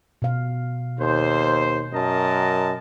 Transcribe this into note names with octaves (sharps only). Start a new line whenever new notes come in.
B2 F5
D#2 C5
F#2 A#4 D#5 A5